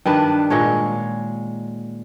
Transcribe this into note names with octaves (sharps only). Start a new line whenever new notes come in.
G2 D#3 D4 B4
A#2 G#3 C#5